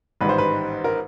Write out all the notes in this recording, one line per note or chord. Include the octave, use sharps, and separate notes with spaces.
A1 G#2 D#3 G3 B4
C5
B4
A#4